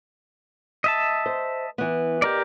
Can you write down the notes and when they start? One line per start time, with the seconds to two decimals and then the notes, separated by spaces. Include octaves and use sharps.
0.84 D#5 E5 A5
1.26 C5
1.78 E3 B3
2.22 G4 A#4 D5 D#5